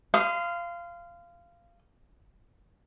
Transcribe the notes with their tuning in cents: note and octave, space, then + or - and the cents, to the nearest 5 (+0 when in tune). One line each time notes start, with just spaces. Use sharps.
F5 -15 C6 -35 D#6 +5